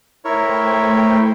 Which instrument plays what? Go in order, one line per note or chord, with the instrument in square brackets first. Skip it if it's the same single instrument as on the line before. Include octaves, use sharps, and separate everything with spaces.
[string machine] A3 C5 G5 [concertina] E4 A#4 C#5